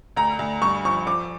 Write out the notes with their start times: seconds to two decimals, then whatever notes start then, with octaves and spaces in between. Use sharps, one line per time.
0.16 D2 A#5
0.39 D2
0.62 G2 C#6
0.85 F3 C#6
1.07 F3 D6